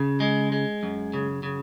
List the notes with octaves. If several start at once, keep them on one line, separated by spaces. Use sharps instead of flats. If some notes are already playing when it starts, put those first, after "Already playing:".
Already playing: C#3
G#3
G#3
F#2
C#3
C#3